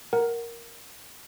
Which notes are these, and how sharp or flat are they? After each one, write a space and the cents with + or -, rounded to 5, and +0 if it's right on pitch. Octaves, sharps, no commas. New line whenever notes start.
A#4 +5 F#5 +0